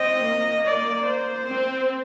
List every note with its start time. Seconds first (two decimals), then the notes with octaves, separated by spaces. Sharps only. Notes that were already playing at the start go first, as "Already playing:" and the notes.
Already playing: C4 D#5
0.27 A#3
0.66 D5
1.06 C5
1.46 C4